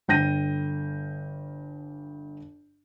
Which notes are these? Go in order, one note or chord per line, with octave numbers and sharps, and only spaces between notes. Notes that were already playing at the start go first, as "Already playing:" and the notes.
G1 G5 G6 A#6 D#7